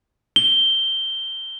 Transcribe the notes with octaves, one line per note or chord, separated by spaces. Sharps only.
G7